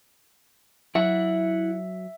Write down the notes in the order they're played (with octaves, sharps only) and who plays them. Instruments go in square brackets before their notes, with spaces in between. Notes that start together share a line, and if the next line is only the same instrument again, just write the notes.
[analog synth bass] F#3 [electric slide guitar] E4 F#5 [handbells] E5